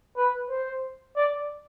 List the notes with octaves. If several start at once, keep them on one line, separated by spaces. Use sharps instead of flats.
B4
C5
D5